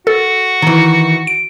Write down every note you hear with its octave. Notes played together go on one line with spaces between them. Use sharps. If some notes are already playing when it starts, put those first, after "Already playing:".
F#4 A4
D#3 E3
D7